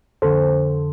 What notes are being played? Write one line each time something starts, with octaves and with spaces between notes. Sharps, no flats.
F2 D3 A4 C5